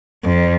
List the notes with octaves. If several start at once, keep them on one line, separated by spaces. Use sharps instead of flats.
F2